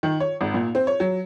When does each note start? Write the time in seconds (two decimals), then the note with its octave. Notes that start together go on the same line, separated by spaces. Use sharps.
0.03 D#3
0.20 C#5
0.41 G#1
0.54 A#2
0.75 C4
0.87 C#5
1.00 F#3